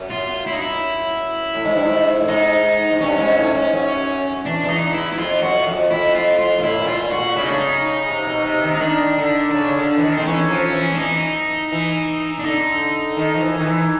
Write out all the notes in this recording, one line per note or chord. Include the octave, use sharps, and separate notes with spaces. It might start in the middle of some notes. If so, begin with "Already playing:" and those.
Already playing: F#2
F4
E4
D#4
E4
A2
G#2
G2
G#2
A2
G#2 D#4
G#2
G2 C#4
G#2
A2
G#2
F#2
E2 D4
E2 D4
D#4
E4
E4
F2 F4
F#2 F#4
F2
F2 E4
F4
F4
A#2
A2 E4
A#2
F4
A#2
F#4
A#2
C#3 E4
D#4
D4
D#4
C3
B2
C3
D#3
D#4
D#3 D4
D3
D3
C#3
D3
E3
D#3
D#3 C4
E3 C#4
F3
E3
D4
E3 D#4
E3
D4
D3 D#4
D#3
F3
E3
D#3
E3